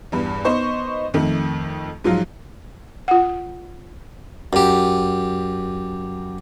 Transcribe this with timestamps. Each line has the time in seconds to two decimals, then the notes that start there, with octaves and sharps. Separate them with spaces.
0.12 E2 G2
0.45 B3 D#4 C5 C#6
1.14 F2 D#3 A3
2.04 G#2 F3 F#3 F4
3.08 F4 F#5
4.53 F#2 G4